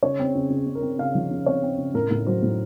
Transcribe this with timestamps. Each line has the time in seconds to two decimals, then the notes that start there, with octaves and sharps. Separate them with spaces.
0.03 C#3 C#5
0.19 C4
0.35 C#3
0.50 C#3
0.67 C#3
0.75 A#4
0.82 C4
0.99 C#3 F5
1.15 F3
1.31 C#3
1.46 C4 C#5
1.63 C4
1.78 C#3
1.94 A2 A#4
2.11 A2
2.27 F#3 C5
2.43 A2